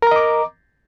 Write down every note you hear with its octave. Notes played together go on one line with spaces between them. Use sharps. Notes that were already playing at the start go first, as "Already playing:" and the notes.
A#4 D#5 A#5 D6